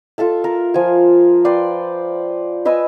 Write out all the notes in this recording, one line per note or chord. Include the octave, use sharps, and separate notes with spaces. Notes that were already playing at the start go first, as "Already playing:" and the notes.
F4 A4 E5 A5
A#4
F3 G#5
B4 D5 G5 C6
B4 D#5 G#5 E6